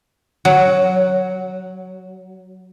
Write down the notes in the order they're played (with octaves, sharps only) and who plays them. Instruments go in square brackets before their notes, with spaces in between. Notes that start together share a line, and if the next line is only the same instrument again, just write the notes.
[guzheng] F#3 [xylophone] F#5